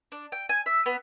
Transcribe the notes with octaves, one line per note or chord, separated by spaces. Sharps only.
D4
G5
G#5
E5
B3